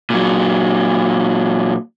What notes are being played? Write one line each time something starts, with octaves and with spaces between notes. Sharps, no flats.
A#2 F#3